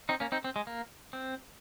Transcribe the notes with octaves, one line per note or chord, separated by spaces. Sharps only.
C4 D#4
A#3 C#4
C4 D#4
C4
G#3
A#3
C4